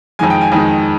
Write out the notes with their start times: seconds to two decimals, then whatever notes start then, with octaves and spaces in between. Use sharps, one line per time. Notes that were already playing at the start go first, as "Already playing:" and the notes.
0.19 F2 D#3 G#3 G#5
0.30 G5
0.41 G#5
0.52 F2 D#3 G#3